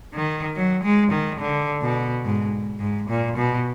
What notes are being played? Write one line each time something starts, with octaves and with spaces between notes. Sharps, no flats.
D#3
F#3
G#3
D#3
D3
B2
G#2
G#2
A#2
B2